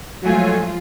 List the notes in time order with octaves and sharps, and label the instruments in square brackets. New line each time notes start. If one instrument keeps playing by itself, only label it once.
[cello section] F3 G#3 F4 [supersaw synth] F#3 A3 G#5